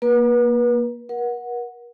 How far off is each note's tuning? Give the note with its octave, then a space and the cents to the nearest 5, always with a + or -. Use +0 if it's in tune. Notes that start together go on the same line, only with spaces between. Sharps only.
A#3 +15 B4 -35
A#4 +40 F#5 -10